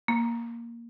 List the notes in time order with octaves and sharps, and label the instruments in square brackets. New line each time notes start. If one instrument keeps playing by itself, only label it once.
[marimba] A#3